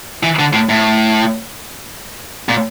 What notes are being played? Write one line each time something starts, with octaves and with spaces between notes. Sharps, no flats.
E3
D3
A2
A2
A#2